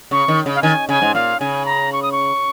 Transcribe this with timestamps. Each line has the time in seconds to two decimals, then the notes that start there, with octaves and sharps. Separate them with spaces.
0.11 C#3 C#6
0.28 D#3
0.46 C#3
0.55 F5
0.62 D#3 G#5
0.89 C#3 G#5
1.02 G#2
1.14 A#2 F5
1.40 C#3 G#5
1.66 A#5
1.93 C#6
2.02 D#6
2.12 C#6